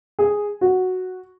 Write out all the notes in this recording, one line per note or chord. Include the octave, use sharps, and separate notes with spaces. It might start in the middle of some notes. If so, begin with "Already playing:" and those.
G#4
F#4